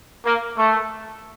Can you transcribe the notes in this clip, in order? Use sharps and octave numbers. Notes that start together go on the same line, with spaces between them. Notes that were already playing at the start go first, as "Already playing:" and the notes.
A#3
A3